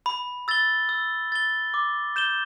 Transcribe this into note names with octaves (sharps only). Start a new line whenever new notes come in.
B5
E6 A6 G7
E6
A6 G7
D6
G6 E7 G7